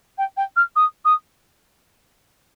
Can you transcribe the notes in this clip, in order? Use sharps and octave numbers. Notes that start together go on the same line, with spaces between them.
G5
G5
F6
D#6
D#6